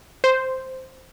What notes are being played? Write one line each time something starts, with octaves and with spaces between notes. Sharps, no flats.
C5